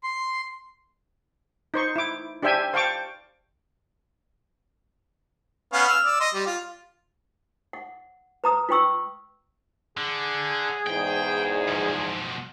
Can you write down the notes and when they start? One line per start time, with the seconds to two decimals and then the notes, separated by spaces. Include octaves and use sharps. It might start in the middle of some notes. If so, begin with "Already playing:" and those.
0.03 C6
1.74 D#4 C5 C#6
1.96 E4 D6
2.43 D4 G4 C5 E5 G5 G#5
2.74 C5 F5 G5 A5 C#6 D6
5.73 B3 C#4 F5
5.88 E6 F6
6.05 D5 E6
6.21 D#5 C6
6.34 G3
6.47 F4
7.73 F#5
8.44 B4 A#5 D#6
8.69 F4 B4 G5 C#6 E6
9.97 D3 G#4
10.87 E2 G#2 G5
11.68 B2 F3